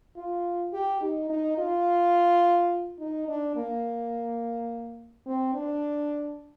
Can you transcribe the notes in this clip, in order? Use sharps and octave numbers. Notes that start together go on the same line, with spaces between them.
F4
G4
D#4
D#4
F4
D#4
D4
A#3
C4
D4